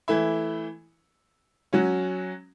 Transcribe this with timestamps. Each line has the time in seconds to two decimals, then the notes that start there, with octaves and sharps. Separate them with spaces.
0.08 E3 A3 E4
1.73 F#3 C#4 F#4